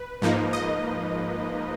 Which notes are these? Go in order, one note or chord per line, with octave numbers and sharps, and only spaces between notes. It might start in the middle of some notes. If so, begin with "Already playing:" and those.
Already playing: B4
G#2 F3 A#3 D#4
D#5